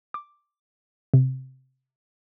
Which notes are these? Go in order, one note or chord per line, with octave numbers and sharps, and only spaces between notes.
D6
C3